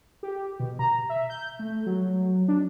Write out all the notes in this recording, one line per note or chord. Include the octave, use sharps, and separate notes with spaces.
G4
B2
A#5
E5
G6
A3
F#3
D4